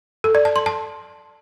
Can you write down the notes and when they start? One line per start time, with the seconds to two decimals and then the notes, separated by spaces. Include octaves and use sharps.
0.24 A4
0.35 D5
0.45 A5
0.56 C6
0.66 A5